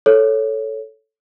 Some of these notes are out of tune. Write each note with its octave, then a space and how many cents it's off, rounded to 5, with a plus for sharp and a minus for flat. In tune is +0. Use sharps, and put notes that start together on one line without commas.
A4 +0 C#5 +0